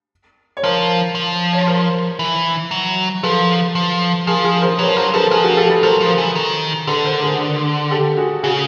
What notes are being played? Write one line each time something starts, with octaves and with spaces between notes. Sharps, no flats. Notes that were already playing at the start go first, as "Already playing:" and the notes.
C#5
F3 A#4 C5
F3
C#5
A#4 C5
E3
F#3
F3 A4 B4
F3
F3 G#4 A#4
G#4 A#4
A#4 C5
F#3 B4 C#5
F3
F#3 A#4 C5
F3 A4 B4
F3 G#4 A#4
F#4 G#4
G4 A4
A4 B4
F#3 A#4 C5
F3
E3
D#3
D3 A4 B4
A#4 C5
G#4 A#4
G4 A4
F#4 G#4
C#3 F#4 G#4